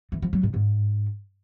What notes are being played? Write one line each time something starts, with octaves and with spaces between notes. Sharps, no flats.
E3
F3
F#3
G#2
G#2